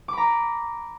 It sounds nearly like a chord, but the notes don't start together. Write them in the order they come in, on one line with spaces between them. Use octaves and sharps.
D6 B5 A#5